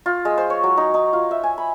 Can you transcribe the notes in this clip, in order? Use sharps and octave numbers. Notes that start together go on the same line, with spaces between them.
F4
G#3
C5
C#5
F#3
D#4
D#4
F4
E5
G#5
B5